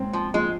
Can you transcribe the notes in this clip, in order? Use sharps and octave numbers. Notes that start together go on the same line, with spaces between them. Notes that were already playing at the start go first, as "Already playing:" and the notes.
Already playing: G#2 C4
F3
F3 G#3